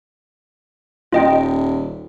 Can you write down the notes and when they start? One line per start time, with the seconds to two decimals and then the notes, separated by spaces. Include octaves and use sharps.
1.12 D#1 F4 D#5 G5